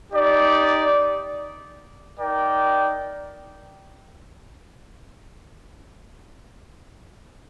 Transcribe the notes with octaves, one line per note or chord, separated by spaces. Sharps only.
D#4 G4 D5
D#4 A#4 D5 G5